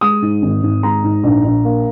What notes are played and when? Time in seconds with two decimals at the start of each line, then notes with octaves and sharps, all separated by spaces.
0.01 G#3 D#6
0.22 G#2
0.42 G#1
0.62 G#1
0.83 G#3 A#5
1.04 G#2
1.23 A#1
1.44 A#1
1.65 A#3